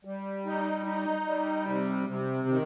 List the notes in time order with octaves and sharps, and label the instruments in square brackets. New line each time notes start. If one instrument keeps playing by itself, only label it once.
[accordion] G3
D#4
D#4
G3
C3
C3
D#3